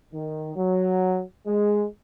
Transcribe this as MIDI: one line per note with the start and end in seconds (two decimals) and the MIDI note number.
0.13 0.52 51
0.56 1.21 54
1.47 1.85 56